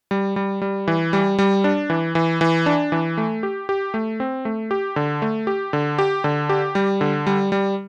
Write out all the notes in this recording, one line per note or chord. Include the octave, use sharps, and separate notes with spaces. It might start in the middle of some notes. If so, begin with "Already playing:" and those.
G3
G3
G3
E3
G3
G3
D4
E3
E3
E3
D4
E3
A3
G4
G4
A3
C4
A3
G4
D3
A3
G4
D3
G4
D3
G4
G3
D3
G3
G3